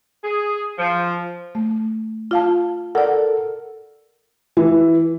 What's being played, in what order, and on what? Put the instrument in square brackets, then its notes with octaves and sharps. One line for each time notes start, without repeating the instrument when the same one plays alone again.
[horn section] G#4
F3
[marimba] A3
F4 F5 A5
[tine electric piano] A4 A#4 [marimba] D5 F#5
[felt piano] E3